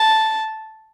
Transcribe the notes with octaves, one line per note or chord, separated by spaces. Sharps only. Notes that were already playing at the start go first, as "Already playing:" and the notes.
Already playing: A5